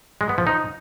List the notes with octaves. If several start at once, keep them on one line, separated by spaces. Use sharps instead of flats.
G#3
B3
F3
D#4